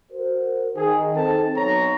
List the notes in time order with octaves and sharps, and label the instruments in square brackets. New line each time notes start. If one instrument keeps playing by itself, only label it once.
[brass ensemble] F#4 A#4 C5
[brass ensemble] D#3 [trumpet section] G#4
[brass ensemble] C4 D#4 A4 [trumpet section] A5
[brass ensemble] B1 [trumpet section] C#5 A#5